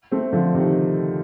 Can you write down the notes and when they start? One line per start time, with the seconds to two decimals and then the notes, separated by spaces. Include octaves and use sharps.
0.11 A3 C4
0.33 D3 F3
0.54 C3 D#3